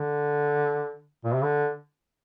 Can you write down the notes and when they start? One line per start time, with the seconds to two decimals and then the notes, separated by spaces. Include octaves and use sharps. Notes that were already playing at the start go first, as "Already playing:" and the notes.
Already playing: D3
1.25 A#2
1.34 C3
1.43 D3